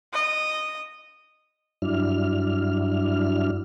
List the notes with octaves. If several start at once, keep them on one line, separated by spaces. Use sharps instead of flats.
D#5
G2 F#3 D4 E4 F6